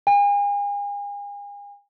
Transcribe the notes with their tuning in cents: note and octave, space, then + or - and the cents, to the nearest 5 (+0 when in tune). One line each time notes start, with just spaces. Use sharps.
G#5 -40